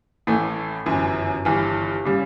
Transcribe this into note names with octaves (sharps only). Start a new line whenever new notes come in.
A1 A2 E3 A3
G1 F#2 E3
G1 G2 E3
C#3 G3